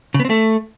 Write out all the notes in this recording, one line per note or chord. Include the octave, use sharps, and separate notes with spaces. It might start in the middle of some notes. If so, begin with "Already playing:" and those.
C#3
B3
C4
A3